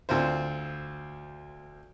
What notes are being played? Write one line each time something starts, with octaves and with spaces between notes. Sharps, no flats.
D2 C4 F4 C5